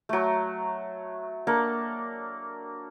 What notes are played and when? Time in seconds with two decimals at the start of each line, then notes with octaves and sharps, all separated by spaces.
0.09 F#3 A3
1.47 A#3 D4 A4